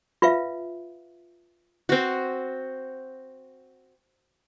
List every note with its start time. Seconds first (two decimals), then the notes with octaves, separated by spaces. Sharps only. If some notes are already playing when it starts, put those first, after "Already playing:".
0.22 F4 B4 E5 F5
1.89 C4 F#4